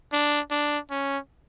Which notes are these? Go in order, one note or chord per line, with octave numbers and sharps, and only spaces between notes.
D4
D4
C#4